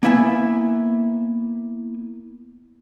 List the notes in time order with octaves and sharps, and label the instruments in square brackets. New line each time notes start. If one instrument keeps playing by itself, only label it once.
[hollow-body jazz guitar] A#3 B3 E4 E5 G#5